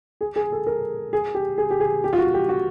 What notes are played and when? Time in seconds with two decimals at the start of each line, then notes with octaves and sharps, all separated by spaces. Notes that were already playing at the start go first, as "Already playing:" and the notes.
0.21 G#4
0.36 G#4
0.52 A4
0.67 A#4
1.13 G#4
1.35 G4
1.58 G#4
1.70 G4
1.80 G#4
2.04 G4
2.13 F4
2.19 F#4
2.34 G4
2.49 F#4